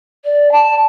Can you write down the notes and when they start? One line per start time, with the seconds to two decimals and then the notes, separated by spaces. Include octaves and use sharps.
0.24 D5
0.51 A5